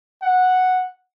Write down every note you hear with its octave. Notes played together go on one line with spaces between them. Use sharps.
F#5